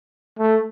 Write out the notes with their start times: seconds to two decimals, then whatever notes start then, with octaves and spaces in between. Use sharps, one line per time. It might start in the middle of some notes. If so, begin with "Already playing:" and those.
0.39 A3